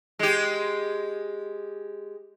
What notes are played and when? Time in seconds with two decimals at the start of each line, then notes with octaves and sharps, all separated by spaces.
0.19 G#3 G4